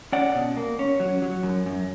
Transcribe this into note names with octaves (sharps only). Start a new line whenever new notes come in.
C#4 D5 F#5
B2
A#3
C#4
F#3
F#3
F#2
F#2